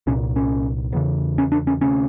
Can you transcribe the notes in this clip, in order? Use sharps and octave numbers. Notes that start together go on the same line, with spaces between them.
C2 A#2 C#4
C#4
E2 C#3
C#4
D4
C#4
D2 C3 C#4